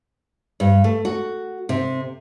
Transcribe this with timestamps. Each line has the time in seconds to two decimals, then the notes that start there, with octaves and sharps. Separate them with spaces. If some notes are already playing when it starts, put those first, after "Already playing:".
0.60 G2
0.84 A3
1.05 F#4
1.69 C3